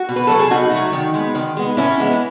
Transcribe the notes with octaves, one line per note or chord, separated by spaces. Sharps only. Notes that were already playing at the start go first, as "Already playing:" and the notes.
Already playing: F#4
B2
B4
F#3 A3 A4
G#4
B2 D#4 F#4
F#3 A3
D#3
G#3 B3
D#3
G#3 B3
A2 C#4 E4
E3 G#3 B3